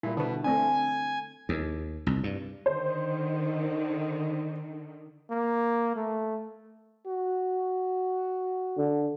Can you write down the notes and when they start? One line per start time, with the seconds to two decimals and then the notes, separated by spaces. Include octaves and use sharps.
0.03 A#2 G3 E4
0.17 B2 D3 B4
0.44 A3 C4 D4 G#5
1.49 D#2
2.07 C2
2.24 G2
2.66 D3 D#3 C5
5.30 A#3
5.96 A3
7.08 F#4
8.77 D3